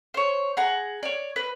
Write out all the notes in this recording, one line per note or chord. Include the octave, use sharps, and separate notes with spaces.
C5 C#5
G#4 F#5 A#5
C#5 D5
B4